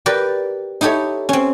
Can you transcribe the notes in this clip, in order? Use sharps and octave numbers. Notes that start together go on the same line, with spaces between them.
G4 A#4 B4 D5
D#4 E4 G4 A4 C#5
C4 C#4